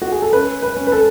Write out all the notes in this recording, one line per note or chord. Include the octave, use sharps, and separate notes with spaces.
F#4
G#4
A4
C#4 B4
B4
C#4
B4
A4